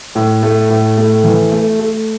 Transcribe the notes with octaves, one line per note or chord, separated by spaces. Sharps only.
A2
A3
A2
A3
E3
A3
A3